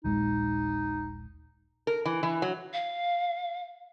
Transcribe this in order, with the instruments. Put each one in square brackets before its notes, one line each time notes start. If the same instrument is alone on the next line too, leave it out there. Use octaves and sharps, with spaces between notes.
[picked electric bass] D#1 A#1 G#3 [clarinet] D#4
[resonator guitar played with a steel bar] A#4
E3
E3
F#3
[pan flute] F5